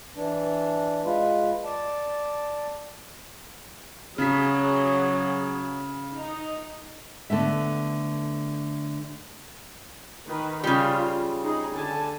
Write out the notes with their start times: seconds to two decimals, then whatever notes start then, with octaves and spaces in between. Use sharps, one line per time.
0.16 E3 D4
1.04 G#3 F4 B4
1.64 D5 A5
4.18 C#3 F#3 G#4 B6
6.15 D#4
7.30 D3 A3 B3 E5
10.26 D#3 B4
10.64 C#3 G3 F4
11.42 D#4 G#4
11.74 D3 G#5 A5